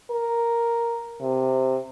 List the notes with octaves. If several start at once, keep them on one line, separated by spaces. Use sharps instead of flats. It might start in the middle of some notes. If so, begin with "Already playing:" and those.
A#4
C3